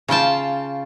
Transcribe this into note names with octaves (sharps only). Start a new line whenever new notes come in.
C#3 F4 G5 A5